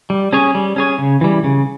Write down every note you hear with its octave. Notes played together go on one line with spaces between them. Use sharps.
G3
C#4 G#4 C#5
G3
C#4 G#4 C#5
C#3
E3 G3
C#3